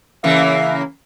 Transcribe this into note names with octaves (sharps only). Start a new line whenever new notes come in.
C#3 E3 A#3 E5